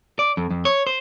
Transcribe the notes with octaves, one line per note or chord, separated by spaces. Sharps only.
D5
F2
F2
C#5
C5